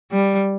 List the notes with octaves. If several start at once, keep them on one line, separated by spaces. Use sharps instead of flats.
G3